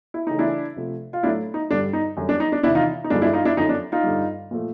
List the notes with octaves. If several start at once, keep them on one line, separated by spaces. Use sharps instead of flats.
E4
C#3 E3 A3 D#4
D4 E4
C3 F3 A3
F4
A2 F#3 A3 D4 E4
D#4
G2 D3 G3 D4
D#4
F#2 D3 G3
D4
D#4
D4
E2 C3 D#3 D4 E4
D#4 F4
D#4
G2 D3 F3 G#3 D4
D4 E4
D#4 F4
D4 E4
F#2 D3 F3 D#4
D4
D#4 F4
G2 D3 G3
A#2 F3 A3